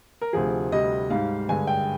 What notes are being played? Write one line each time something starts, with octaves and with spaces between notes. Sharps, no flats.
A#4
D2 C3 F3 G#4
D2 C3 G3 D#5
G#2 G3 F5
G2 D3 G#3 G#5
G5